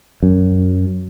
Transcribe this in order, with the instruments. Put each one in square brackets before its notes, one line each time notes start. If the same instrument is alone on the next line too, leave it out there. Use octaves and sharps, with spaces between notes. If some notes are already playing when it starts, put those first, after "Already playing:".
[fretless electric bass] F#2